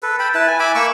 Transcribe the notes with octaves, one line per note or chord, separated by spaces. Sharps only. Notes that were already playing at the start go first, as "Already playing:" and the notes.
A4 B4
G5 A5 B5
E4 B4 A5
G#5
E5 G#5 B5 D6
A#3 C#6 D6 E6